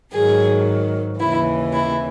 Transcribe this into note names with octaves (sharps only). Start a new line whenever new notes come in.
G#2 D#3 F#3 G#4
D#2 C#3 E3 E4
E4